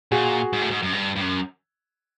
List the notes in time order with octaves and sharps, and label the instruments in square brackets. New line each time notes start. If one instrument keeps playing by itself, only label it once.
[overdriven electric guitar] A#2 [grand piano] F#4 G#4
[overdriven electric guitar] G#2
A2
G#2
F#2
G2
G2
F#2